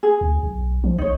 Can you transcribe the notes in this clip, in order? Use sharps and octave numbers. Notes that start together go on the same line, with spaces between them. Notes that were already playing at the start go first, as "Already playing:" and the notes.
G#4
D2
B1
F3
A#1 D#4 C#5